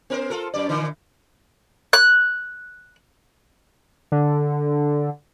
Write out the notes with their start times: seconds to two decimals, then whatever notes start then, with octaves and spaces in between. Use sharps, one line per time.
0.10 B3 A#4 C5
0.30 F4 A4 A#4
0.54 F#2 D5
0.69 A#2 D3 E3
1.93 F#6
4.12 D3